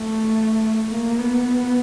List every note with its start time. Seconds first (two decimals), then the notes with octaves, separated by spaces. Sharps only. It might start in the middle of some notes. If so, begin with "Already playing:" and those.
Already playing: A3
0.90 A#3
1.19 B3